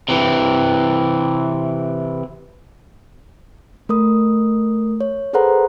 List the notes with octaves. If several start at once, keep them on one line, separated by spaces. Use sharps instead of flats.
C3 E3
A3 A#4 D#6
C#5
G#4 A4 B4 C5 F#5 A#5